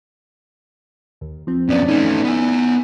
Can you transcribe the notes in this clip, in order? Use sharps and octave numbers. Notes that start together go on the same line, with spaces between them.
D#2
F3 C4
F#2 B3 C#4 D5 A6
A3 C#4 D#4
B3 G#5